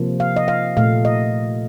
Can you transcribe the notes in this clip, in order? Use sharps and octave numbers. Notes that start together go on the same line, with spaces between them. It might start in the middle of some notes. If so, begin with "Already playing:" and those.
Already playing: C3 F3 A#3
F5
D#5
F5
A#2 A3 F5
D#5